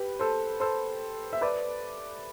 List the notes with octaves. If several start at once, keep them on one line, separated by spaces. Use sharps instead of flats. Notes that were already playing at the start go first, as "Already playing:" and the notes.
Already playing: G4 B4
A4 C5
A4 C5
E5
B4 D5